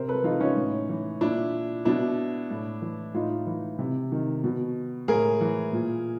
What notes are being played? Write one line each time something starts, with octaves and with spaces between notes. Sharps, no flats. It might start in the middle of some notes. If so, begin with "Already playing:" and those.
Already playing: C3 A#4 C5
A4 B4
E3 D#4 F4
C#4 D#4
A2
E3
A#2 D4 E4
B2 D4 E4
A2
E3
A2 D#4 F4
E3
C3
D#3
B2
A2 G#4 A#4
E3
A#2